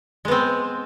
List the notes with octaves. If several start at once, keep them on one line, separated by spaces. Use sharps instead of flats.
G#3 B3 C4